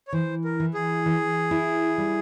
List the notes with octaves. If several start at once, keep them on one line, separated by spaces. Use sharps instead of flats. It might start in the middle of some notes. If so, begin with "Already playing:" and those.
C#5
E3 C5
A#4
E3
G#4
E3
E4
G3